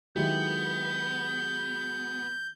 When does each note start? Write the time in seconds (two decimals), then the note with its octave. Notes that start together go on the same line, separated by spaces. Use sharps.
0.16 D#3 F#3 G#3 B3 E4 G4 G6